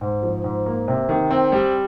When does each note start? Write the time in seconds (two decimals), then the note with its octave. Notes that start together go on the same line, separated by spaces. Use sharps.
0.01 G#2
0.23 F3
0.44 G#2
0.66 A#3
0.88 C3
1.09 D#3
1.31 C4
1.52 G3